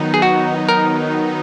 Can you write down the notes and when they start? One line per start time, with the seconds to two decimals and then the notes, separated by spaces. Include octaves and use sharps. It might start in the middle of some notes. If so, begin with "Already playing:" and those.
Already playing: D#3 F#3 B3 D#4
0.14 G#4
0.22 F#4
0.69 A#4